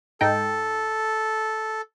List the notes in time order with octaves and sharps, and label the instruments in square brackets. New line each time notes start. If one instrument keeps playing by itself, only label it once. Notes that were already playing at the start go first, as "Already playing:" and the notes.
[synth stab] G#2 D#4 G5 [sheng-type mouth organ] A4